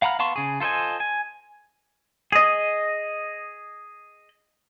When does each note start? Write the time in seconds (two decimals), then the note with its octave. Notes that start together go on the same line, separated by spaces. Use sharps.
0.02 F5 F#5 A#5 B5 F6
0.19 B3 F5 A5 C6 C#6
0.36 C#3 G#4
0.60 F4 A4 C5 D#5 G#5
1.00 G#5
2.32 G#4 D#5